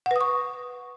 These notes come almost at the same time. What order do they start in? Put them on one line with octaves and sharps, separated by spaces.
F#5 B4 D#6 C#6